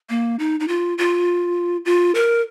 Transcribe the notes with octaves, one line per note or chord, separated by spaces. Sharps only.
A#3
D#4
D#4
F4
F4
F4
A#4